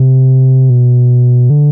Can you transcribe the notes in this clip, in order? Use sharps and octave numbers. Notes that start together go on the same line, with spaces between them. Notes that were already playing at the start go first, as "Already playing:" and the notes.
Already playing: C3
B2
D3